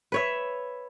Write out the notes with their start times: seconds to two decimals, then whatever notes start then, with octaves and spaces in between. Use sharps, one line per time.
0.12 B4 C#5 E5